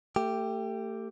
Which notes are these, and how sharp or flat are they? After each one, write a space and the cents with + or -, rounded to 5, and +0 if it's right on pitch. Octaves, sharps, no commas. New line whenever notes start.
A3 +30 G4 +0